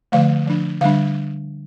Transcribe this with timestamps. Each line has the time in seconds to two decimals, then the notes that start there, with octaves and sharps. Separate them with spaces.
0.12 D3 F3 A3 F5
0.47 F3 D4
0.81 D3 G3 D4 F5